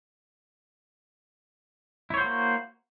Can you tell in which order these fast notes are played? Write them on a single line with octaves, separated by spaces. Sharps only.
E4 C#5 C5 F#4 A#3